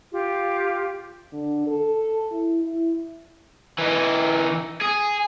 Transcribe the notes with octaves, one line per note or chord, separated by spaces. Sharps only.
F4 G4
D3
A4
E4
E4
E3 D#4
G#4